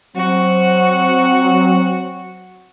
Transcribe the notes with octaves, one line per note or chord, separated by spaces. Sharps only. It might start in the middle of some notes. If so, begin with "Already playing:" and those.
F#3 C4 F#4